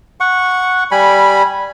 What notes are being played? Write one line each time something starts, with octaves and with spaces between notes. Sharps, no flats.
F#5 C#6
G3 G#5 B5